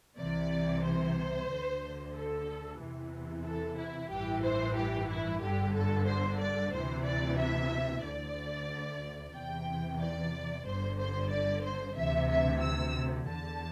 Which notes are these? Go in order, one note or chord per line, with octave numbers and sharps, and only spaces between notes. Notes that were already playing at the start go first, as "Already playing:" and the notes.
C2 C3 E3 D5
C5
D2 D3
A4
E2 C3 E3
A4
E4
A1 G2 E3 G4
C5
G4
E4
G1 G2 D3 G4
A4
C5
D5
D2 C3 E3 C5
D5
E5
D2 D3 D5
E2 C3 E3 G5
D5
G1 G2 D3 C5
C5
D5
C5
D2 C3 E3 E5
E5
E6
E2 D3 A5